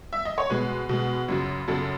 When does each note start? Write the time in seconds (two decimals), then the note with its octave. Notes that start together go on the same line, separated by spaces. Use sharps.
0.13 E5
0.25 D#5
0.38 C#5
0.50 B2 G#3 B4
0.89 B2 G#3
1.28 F#2 C#3 F#3
1.68 F#2 C#3 F#3 A4